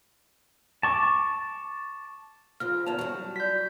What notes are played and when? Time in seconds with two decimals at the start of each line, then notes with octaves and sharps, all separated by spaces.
0.83 A5 C#6 D6
2.60 C#3 F3 F6
2.86 E2 D#3 C#4 A5 F7
2.99 F#3 G3
3.36 F#4 D5 G6 B6